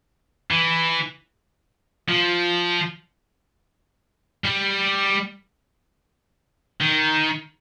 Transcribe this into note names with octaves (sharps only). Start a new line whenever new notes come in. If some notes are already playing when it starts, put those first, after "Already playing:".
E3
F3
G3
D#3